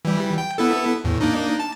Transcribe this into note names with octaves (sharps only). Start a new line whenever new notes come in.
E3 G3
G5
B3 E4 A4
E2 A2
A#3 D4 D#4
A5